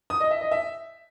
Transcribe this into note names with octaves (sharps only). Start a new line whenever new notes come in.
D#6
D#5
E5
D#5
E5